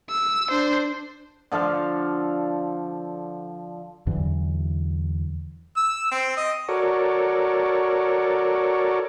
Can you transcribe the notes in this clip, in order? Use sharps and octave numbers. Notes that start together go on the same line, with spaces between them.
E6
D4 C5
D3 F3 A4 F5
E2 D3 E3 F#3
E6
C4
D#5
F#4 A4 A#4 C#5 D5